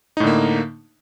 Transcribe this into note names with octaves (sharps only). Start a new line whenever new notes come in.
A2 D3 A#3 D#4